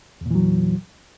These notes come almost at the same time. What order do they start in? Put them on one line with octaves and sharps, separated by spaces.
E2 A#2 E3 F#3